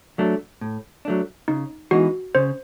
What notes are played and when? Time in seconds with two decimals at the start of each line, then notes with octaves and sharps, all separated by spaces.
0.18 F#3 A3 D4
0.61 A2
1.05 F#3 A3 D4
1.48 C#3 D#4
1.91 E3 G#3 B3 D#4 F#4
2.35 C#3 C5